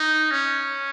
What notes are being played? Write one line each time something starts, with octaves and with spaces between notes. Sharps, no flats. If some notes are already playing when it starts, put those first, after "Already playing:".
Already playing: D#4
C#4